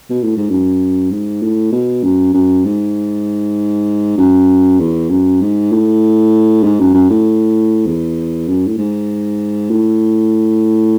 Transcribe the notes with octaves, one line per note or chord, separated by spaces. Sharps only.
B2
A2
G#2
F#2
G#2
A2
B2
F#2
F#2
G#2
F#2
E2
F#2
G#2
A2
G#2
F#2
F#2
A2
E2
F#2
A2
G#2
A2